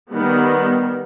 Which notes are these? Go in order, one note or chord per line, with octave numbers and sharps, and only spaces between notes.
D#3 G3 B3